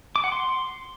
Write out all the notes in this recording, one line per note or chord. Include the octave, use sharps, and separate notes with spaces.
D6
F#5
C6